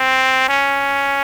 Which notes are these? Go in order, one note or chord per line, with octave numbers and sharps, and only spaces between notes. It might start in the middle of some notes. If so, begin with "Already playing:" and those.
Already playing: C4
C#4